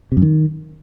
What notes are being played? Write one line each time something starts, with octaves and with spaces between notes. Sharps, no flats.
C3
F#2
D#3